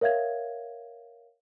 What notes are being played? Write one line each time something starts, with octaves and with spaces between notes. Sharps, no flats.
A#4 C#5 E5 F5 G#6